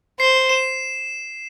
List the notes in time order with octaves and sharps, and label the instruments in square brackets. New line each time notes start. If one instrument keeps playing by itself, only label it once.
[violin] C5 [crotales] C7
[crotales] E7